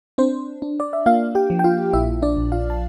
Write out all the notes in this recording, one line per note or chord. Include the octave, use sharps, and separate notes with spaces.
C4 D4 C5
D4
D5
E5
A#3 F4 F5
G4 G5
F3
G5
F4 F5
A#1 E4 E5
D4 D5
A#1
F4 F5
A5